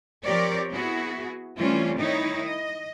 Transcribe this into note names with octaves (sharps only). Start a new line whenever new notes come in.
F3 C4 G4 A#4 C#5 D5
B3 E4 F#4 G#4
E3 G3 A3 C4 C#4 F4
D#3 D#4 E4 C#5
D#5